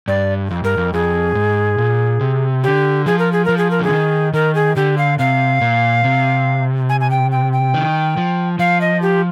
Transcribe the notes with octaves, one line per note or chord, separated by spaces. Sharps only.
G2 D5
F2
G2 A#4
F2
F2 G#4
G#2
A#2
C3
D3 G4
F3 G#4
A#4
G#4
F3 A#4
G#4
A#4
D3 G#4
D#3
D#3 A#4
G#4
D3 G4
F5
C3 F5
A#2
C3
G#5
G#5
G5
G5
G5
D#3
F3
F3 F5
D#5
G4